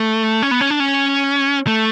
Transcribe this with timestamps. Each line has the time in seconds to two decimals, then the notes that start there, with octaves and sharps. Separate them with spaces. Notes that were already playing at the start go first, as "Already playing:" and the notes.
Already playing: A3
0.43 C#4
0.51 B3
0.61 C#4
0.71 D4
0.80 C#4
1.67 A3